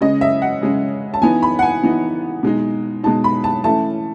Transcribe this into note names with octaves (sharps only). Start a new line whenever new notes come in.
C#3 G#3 C#4 D#5
E5
F#5
C#3 G#3 C#4
A5
E3 B3 D#4 G#5
B5
F#5
G#5
E3 B3 D#4
B2 G#3 D#4
B2 G#3 D#4 A5
B5
A5
E3 A3 C#4 A5